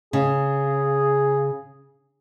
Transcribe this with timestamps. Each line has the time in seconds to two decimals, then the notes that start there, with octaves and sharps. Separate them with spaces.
0.13 C#3 G#4